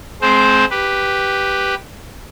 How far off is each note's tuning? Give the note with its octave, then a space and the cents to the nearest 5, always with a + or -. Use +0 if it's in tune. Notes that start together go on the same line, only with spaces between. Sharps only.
G#3 +35 C4 +0 C5 +0
G4 +0 B4 +0